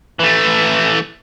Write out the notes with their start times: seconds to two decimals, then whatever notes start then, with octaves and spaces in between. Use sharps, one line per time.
0.19 E3 A3